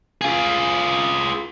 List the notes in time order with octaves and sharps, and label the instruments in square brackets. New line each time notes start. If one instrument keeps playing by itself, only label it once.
[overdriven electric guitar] F4 G#4